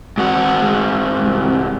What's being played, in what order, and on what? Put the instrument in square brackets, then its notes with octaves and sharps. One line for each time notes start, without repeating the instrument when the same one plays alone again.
[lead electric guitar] G#2 F#4
[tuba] G#3
C2